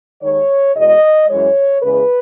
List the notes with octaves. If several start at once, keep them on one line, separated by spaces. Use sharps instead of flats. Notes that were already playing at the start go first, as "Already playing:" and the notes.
D#2 D#3 G#3 C#5
E2 B2 G#3 D#5
F#2 E3 G#3 C#5
E2 C#3 G#3 B4